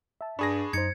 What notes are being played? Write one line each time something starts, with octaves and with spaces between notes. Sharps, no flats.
E5 A5
G2 D4 G#4 B5 C#6 A#6
F#2 D#4 C5 G#6 C#7